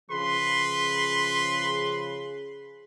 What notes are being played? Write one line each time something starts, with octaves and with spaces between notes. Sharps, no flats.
C#3 F3 G#4 B4 C6